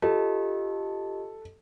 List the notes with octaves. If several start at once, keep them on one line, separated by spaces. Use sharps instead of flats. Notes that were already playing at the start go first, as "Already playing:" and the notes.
F4 G4 A4 D#5